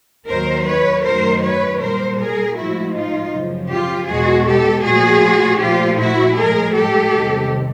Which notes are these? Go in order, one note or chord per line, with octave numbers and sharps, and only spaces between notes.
D#2 D#3 F#3 A#4 C5
B4 C#5
F#2 D#3 F#3 A3 A#4 C5
B4 C#5
A#2 G3 A#4 C5
G#4 A#4
A2 F3 G#3 E4 F#4
D#4 F4
F#2 C#3 F3
F4 G4
E2 B2 G#3 F#4 G#4
G4 A4
A#2 F3 A3 F#4 G#4
A#2 F3 A3 F4 G4
E4 F#4
A2 F3 G#3 G#4 A#4
G4 A4
E2 C3 D#3 G3